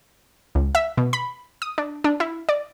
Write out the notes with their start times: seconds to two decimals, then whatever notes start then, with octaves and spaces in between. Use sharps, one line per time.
0.55 C#2
0.75 E5
0.98 B2
1.13 B5
1.62 D#6
1.78 D4
2.04 D4
2.20 E4
2.49 D5